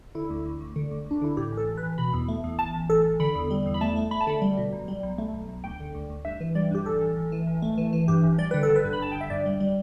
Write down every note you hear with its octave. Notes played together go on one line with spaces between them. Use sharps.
D3 E4
D2
D2
D2
D3
D2
D2 D4
D3 E4
A2 G4
A1
A4
A1
B4
A1
B2 B5
E2
A3
E2
A1 A5
A1
A1 A4
A1
D3 B5
E2
G3
E2
B5
A3 A5
A3
A3 B5
A5
D3 B5
G3
B2
B1
G3
B1
A3
B1
B1
D2 G5
D3
D2
D2
G2 E5
E3
G3 D5
G2 G4
A1 A4
A1
A1
E3
A1
A3
E3
E3
G2 G4
A1
G3 D5
D3 B4
A4
G1
B4
G2
B5
G1 A5
G1 G5
E5
G2 D5
G3
G3